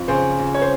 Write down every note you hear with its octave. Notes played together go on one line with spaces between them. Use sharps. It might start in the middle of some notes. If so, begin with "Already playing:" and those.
Already playing: F2
C#3 C5
F2
C#5
C5